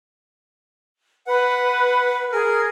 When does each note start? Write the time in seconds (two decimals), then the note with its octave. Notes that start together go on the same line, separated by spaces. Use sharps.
1.27 B4 F#5
2.32 G#4 A#4